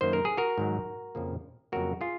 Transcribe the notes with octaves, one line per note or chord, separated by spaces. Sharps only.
F#2 D#3 A#3 C5
A#4
G#4
F#4 A#4
G#2 D#3 F#3
F2 C#3 F3 A#3
F2 C#3 F#3 A#3 F#4 A#4
F4 G#4